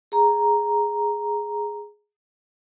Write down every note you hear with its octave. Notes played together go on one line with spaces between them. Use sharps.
G#4 A#5